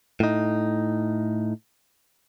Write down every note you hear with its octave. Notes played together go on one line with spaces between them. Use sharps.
A2 D#4